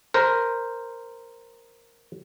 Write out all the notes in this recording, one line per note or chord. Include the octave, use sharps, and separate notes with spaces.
A#4 C5